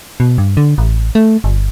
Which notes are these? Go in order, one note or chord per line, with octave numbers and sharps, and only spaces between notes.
B2
G2
D3
A1
A3
G1